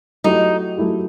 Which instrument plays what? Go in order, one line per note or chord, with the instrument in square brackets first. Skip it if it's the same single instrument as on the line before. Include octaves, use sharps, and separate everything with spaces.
[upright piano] F#3 A3 E4 G4 [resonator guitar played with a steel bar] D#4
[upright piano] F#3 A3 E4 G4